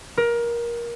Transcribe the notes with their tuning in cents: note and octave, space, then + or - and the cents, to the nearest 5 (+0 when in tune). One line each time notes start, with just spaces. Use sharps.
A#4 +20